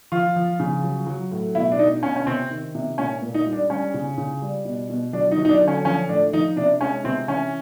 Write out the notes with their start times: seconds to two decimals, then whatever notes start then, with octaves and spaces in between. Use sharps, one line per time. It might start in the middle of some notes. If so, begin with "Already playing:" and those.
0.12 F3 F4
0.36 F3
0.60 C#3
0.84 F#3
1.07 F#3
1.32 A2
1.55 B2 E4
1.72 D4
1.79 B2 D#4
2.03 B2 C#4
2.16 C#4
2.26 C3 C4
2.50 D#3
2.75 C3
2.98 A#2 C#4
3.22 A#2
3.34 D#4
3.46 G3
3.53 D4
3.70 G3 C#4
3.94 C#3
4.18 C#3
4.42 G3
4.65 B2
4.90 B2
5.13 F#3 D4
5.31 D#4
5.37 F#3
5.45 D#4
5.49 D4
5.61 D3
5.68 C#4
5.85 F3 C#4
6.09 A2 D4
6.33 F3 D#4
6.56 C3 D4
6.81 G#3 C#4
7.04 C3 C4
7.28 E3 C#4